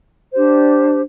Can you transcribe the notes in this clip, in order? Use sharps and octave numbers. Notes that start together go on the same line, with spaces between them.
D4 G4 C5